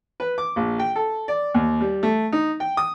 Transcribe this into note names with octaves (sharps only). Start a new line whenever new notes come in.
B4
D6
A#1
G5
A4
D5
D#2
G3
A3
D#4
G5
D#6